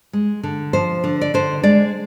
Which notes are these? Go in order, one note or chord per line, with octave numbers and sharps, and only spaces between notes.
G#3
D3
F3 C5
D3
D5
D3 C5
G#3 D5